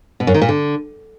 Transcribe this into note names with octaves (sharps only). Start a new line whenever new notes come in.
B2
F#2
D#3
A#2
D3